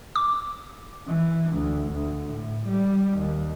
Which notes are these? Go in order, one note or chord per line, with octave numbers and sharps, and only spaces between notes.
D6
E3
D2
D2
A2
G3
D#2